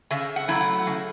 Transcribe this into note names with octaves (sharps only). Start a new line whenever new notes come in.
C#3 E5
F#5
F#3 A3 E4
F#5
C#3